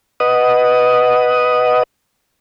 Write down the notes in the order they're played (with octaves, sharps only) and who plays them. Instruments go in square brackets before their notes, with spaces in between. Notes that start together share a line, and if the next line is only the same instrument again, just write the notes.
[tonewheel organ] B4 D#5 F#5 D#6